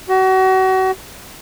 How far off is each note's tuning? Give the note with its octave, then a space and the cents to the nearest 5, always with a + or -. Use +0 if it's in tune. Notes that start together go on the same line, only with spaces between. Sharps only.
F#4 +35